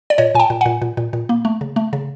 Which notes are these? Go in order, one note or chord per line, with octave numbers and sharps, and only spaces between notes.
D5
A#2 C#5 D#5
A#2 G5 G#5 A5
A#2
A#2 F#5 G#5
A#2
A#2
A#2
A#3
A3
C#3
A3
C#3